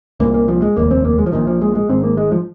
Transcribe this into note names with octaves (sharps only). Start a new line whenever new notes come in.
C2 A#2 A#3
A#3
F3
G#3
F1 D#2 A#3
C4
A#3
G#3
F3
A#1 A#2 D#3
F3
G#3
G#3
G#1 G#2 C4
A#3
G#3
F3